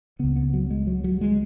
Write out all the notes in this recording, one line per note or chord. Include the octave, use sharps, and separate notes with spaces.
C#2 C#3 B3
B3
F#3
G#3
F#3
F#3
G#3